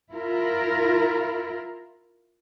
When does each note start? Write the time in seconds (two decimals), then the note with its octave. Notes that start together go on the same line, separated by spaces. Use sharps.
0.13 E4 F4 A#4